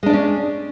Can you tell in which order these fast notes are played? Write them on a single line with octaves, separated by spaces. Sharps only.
G#3 D4 D5 C#4